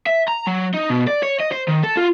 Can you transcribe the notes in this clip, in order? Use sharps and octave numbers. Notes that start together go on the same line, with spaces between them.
E5
A#5
F#3
D#4
B2
D5
C#5
D#5
C5
D#3
A4
F4